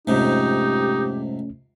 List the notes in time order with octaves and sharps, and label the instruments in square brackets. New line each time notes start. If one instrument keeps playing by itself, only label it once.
[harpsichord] F2 G#2 C3 [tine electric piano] A3 C#4 [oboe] D#4 [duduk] G4